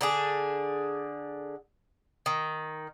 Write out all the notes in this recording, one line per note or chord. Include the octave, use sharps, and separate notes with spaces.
D3 D4 G#4
D#3